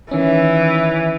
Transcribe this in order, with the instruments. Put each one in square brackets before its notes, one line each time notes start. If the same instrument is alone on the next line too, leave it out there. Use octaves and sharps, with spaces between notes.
[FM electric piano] D#3 C#4 [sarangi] E3